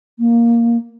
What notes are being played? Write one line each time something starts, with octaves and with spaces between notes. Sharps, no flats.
A#3